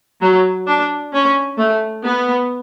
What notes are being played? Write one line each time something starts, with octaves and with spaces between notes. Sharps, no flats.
F#3
D4
C#4
A3
B3